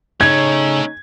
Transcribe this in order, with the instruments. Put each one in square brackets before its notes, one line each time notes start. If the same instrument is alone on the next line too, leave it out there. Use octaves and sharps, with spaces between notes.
[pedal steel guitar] C#3 C#4 [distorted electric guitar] A3 C#5 [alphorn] D#4 [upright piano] G#6